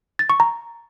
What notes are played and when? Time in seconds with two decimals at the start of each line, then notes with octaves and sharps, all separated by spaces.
0.19 A6
0.30 C#6
0.40 A#5